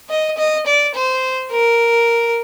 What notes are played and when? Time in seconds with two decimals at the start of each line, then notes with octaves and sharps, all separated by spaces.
0.10 D#5
0.38 D#5
0.66 D5
0.95 C5
1.51 A#4